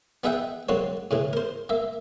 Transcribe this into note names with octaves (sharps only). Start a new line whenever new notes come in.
B3 D#4 G#4 E5 F#5 G5
G#2 F#3 A#3 C4 C#5
A2 C#3 E3
A#4 C5
A#3 E5